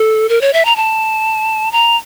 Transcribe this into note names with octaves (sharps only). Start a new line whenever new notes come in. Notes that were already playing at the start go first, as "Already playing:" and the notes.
Already playing: A4
A#4
C#5
E5
A#5
A5
A#5